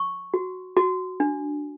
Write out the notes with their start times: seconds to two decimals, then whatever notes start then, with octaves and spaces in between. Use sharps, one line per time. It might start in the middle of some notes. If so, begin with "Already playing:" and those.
Already playing: C#6
0.34 F#4
0.76 F#4
1.20 D4